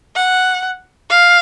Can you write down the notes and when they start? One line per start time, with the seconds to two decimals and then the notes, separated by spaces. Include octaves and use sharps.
0.16 F#5
1.10 F5